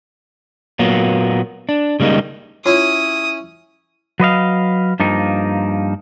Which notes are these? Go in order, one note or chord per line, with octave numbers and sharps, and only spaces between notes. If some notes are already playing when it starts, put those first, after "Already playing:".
A#2 F#3 A#3 B3
D4
C#3 G3 G#3 A#3 D#4
C#4 E4 F4 C#5 D#6
F#3 B4 D#5 F5
G2 F3 A#3 D#4